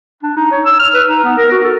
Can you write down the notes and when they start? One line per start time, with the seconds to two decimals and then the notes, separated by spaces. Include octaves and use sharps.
0.23 D4
0.36 D#4
0.51 C#5
0.65 E6
0.79 F6
0.94 B4
1.08 D#4
1.24 B3
1.38 A#4
1.51 F#4
1.64 A4